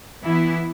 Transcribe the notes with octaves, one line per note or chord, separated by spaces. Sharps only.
E3 B3 E4